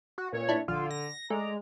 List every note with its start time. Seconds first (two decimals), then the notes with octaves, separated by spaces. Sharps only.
0.18 F#4
0.33 C#2 A#2 C#5
0.49 D4 E4
0.68 A#1 D3 F4
0.91 A#6
1.30 G#3 A3 D5 A#5